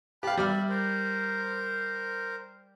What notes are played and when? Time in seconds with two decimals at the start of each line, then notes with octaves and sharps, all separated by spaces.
0.23 G4 F5 A5 B5 F#6
0.38 G3 D5 E5 F6
0.69 A#4 C5